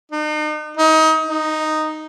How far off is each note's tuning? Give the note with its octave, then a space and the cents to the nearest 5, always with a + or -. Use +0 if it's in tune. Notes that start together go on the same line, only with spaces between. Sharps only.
D#4 -40
D#4 +25
D#4 -5